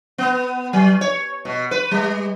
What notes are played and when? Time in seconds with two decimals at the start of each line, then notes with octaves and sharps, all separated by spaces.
0.18 B3
0.73 F#3
1.01 C#5
1.45 B2
1.71 B4
1.91 G3